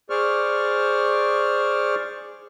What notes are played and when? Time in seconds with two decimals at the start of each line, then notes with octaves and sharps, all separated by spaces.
0.10 G#4 C5 D5 C#6 F6